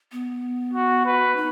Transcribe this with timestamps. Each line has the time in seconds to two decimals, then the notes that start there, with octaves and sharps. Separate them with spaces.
0.12 B3
0.73 F#4
1.06 B4
1.36 D#4